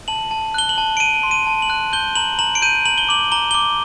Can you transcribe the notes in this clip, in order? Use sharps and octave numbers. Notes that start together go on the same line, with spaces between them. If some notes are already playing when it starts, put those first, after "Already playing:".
A5 F#7
A5
F#6 G7
F#7
A5
D7
A5 D#7
C6
D#7
A5
F#7
F#6
G6 G7
A#5 F#7
A#5 F#7
D7
G6 D#7
A#5 F#7
G7
D6 F#7
A#5 G7
G7
D6